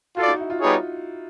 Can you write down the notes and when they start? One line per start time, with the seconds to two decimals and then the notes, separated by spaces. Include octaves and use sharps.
0.17 F4 F#4 A4 D5
0.28 D#4
0.39 E4
0.50 F4
0.61 G3 B3 D#4 G#4 C#5